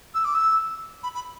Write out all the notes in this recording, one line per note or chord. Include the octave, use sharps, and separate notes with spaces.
E6
D6
E6
B5
B5